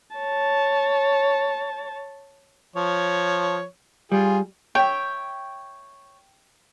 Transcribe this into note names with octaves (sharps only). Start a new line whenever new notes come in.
C#5 A5
F3 C#5
G3 F4 G#4
C#5 E5 G5